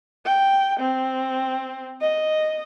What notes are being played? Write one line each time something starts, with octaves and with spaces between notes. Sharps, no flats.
G5
C4
D#5